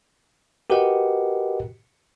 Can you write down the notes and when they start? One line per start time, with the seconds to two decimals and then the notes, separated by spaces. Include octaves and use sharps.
0.70 F#4 G4 A#4 B4 D#5 F#5